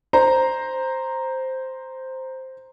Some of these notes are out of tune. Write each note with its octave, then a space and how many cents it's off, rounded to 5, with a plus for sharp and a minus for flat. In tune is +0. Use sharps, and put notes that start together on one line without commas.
C5 +0 A#5 +0